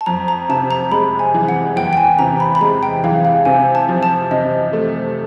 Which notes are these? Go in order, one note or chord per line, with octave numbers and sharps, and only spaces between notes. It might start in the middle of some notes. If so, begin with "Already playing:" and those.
A5
F2 A#5
A#5
C3 A5
A#5
G#3 B5
G#5
E3
F#5
E2 G5
G5
G#5
C3 A#5
B5
B5
G#3 A#5
G5
E3 F5
F5
C3 G#5
A5
F3
A5
C3 D#5
A3